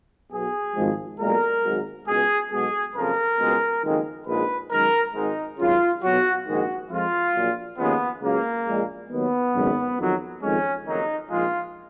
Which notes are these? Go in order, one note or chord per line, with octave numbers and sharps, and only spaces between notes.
B1 B2 F#3 G#4
G#1 G#2 F3 G#3
B1 A#2 G#3 A#4
G#1 G#2 F#3
C#2 B2 G#3 G#4
B1 B2 G#3 G#4
F#1 F2 C#3 F3 A#4
C#2 B2 G#3
F#1 F2 D#3 G#3
A#1 G#2 F3 G#3 B4
F#2 D#3 G#3 A#4
G#1 G#2 D#3 G#3 D#4
G#1 F#2 C#3 F4
B1 B2 F#3 F#4
A#1 G#2 D#3 G#3 F#4
F2 F3 G#3 F4
A#1 A#2 F#3
D#2 C#3 F3 G#3 B3
C#2 C#3 F#3 A#3
A#1 A#2 G#3
D#2 D#3 F#3 B3
G#1 F#2 C#3 G#3
F2 D#3 F#3
F2 D#3 G#3 C#4
F#1 F2 D#3 F#3 D#4
A#1 G#2 F3 G#3 F4